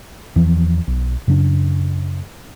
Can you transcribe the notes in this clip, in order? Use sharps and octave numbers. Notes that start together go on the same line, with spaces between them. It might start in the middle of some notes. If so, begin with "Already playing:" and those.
E2 E3 F3
B1
F#2 C#3 C#4 D4